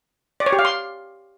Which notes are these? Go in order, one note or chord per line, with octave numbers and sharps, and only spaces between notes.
D5
C#5
G4
F5
C6